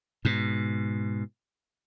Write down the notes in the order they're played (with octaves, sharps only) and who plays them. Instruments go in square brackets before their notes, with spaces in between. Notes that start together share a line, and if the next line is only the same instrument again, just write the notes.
[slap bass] G#2 B2